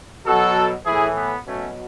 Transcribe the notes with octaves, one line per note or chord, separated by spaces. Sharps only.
B2 F#3 F#4 A4
A2 E3 E4 G#4
B3
B2 F#3 A3 C#4